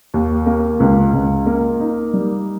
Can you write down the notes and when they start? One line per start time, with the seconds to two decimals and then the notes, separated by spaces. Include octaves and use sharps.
0.14 D#2
0.46 A#3
0.80 C#2
1.13 C#2
1.46 A#3
1.80 D#4
2.14 G3